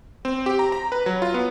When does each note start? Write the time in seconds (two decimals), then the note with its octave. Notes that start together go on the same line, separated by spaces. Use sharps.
0.25 C4
0.46 G4
0.59 A#5
0.72 A#5
0.92 B4
1.06 F#3
1.22 F4
1.34 B3